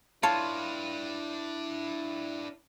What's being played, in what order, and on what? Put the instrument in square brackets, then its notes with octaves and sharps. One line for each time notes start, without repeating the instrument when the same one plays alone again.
[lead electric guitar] D4 B4 [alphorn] E4 [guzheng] F4 C#5 [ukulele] A5